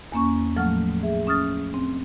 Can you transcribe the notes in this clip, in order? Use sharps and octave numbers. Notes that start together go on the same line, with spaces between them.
E2 A#3 C#4 C#6
A2 F3 F#3 A3 F#5 F6
G#4 E5
C#4 D#6 F6 A6
C4